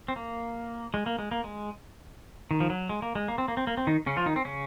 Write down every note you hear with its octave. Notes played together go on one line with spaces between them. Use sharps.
C4
A#3
G#3
A#3
G#3
A#3
G#3
D#3
F3
F#3
G#3
A#3
G#3
A#3
C4
A#3
C4
A#3
C4
D#3 D#4
C#3 C#4
F3 F4
D#3 D#4
C4
C#3 C#4